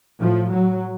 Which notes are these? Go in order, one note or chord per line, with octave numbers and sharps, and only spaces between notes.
A2 F3
A2 F#3